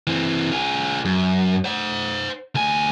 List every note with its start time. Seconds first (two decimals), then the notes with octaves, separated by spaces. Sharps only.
0.07 E3 C4
0.52 F4 G#4
1.05 F#2
1.64 C5 F#5
2.55 D2 G#5